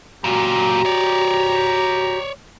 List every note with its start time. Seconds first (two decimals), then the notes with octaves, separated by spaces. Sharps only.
0.24 F#2 A#2 F#4 G4 A#5
0.85 C#5 D5